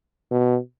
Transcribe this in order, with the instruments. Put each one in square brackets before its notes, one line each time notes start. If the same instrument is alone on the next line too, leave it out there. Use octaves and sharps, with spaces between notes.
[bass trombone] B2